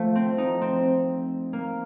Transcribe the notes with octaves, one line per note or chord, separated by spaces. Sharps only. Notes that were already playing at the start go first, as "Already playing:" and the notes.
Already playing: F3 A3
C4
D#4
C4
A#3